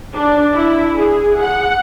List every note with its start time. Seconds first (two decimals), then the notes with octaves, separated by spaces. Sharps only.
0.14 D4
0.54 E4
0.96 G#4
1.40 F#5